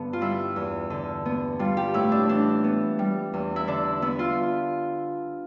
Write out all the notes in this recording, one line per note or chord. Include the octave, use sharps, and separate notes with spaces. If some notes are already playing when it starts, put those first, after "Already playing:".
Already playing: G2 D3 B3
F4
G3 E4
E2
D3
B3
G3 F4
G4
A2 E4
D4
E3 D4
B3
G3
E2
E4
D3 D4
B3 E4
F4